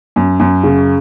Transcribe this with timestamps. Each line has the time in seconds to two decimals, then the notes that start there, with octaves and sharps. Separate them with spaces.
0.16 F#2
0.40 F#2
0.63 C#3